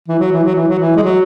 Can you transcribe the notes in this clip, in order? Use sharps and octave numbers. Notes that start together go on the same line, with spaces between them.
E3
F#3
E3
F#3
E3
F#3
E3
G#3
F#3